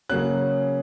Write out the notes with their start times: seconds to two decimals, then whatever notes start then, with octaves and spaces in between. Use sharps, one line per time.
0.10 C#3 F#3 A#3 C#4 F#6